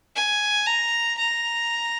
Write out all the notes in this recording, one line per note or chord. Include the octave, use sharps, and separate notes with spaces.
G#5
A#5
A#5